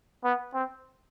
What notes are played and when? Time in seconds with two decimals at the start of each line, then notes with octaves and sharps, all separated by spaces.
0.24 B3
0.54 C4